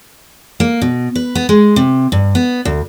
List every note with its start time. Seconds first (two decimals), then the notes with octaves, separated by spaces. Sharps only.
0.60 A#3
0.81 B2
1.15 B4
1.35 B3
1.49 G#3
1.76 C3
2.12 G2
2.35 B3
2.65 D2